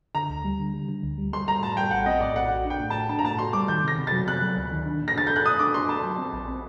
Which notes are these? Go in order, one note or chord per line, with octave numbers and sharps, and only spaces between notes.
D3 A#5
D2
G3
D3
G3
D3
D2
G3
G3 C6
G3 A#5
A2 A5
G3 G5
A#1 F#5
C4 D#5
A2 D5
A#1 F#5
F#4
D4
G5
A2
A2 A5
D4 A5
A#5
A2 A5
F#4 C6
G3 D6
D#3 G6
C3
A#6
C3
A6
F#3
C3 F#6
F#3
D2
D#3
D4
A#2
A#6
D4 A6
A4 G6
F#6
A4 D#6
D4 D6
D4 C6
A4 A5
F#3
C4
A#1
C4